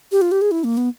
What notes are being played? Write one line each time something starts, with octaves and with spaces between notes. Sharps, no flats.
G4
F4
G4
G#4
E4
A#3
B3